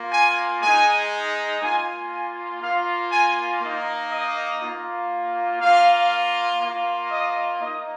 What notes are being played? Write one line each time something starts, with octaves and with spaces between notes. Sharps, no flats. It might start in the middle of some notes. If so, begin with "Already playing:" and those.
Already playing: A#3 F4
G#5
G#3 D#4 G#5
A#3 F4 G#5
G#5
A#3 F4 F5
G#5
A#3 D#4
D#5
A#3 F4
A#3 F4 F5
A#3 F4
D#5
A#3 D#4 D#5